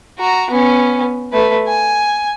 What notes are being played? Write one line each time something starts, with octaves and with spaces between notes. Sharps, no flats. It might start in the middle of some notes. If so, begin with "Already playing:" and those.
F#4 A#5
B3 C#4
A3 B4
G#5